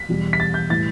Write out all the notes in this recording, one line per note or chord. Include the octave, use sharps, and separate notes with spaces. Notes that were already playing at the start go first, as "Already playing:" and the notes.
Already playing: B6
E2 B2 G3
B6
A6
G6
A2 E3 G3 A6